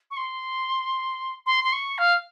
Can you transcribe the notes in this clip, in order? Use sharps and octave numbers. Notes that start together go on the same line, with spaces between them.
C#6
C6
C6
C6
C#6
F5